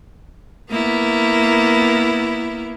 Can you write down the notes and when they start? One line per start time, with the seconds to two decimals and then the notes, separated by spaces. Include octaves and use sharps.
0.71 A#3 B3 E4